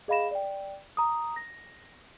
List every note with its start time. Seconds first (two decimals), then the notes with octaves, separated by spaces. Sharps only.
0.08 G#4 D#5 F5 B5 A#6 E7
0.31 D5 G5
0.97 A#5 D#6
1.36 A#6